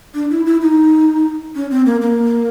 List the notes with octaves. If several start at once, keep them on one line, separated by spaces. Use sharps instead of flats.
D4
E4
E4
D#4
C#4
C4
A#3
A#3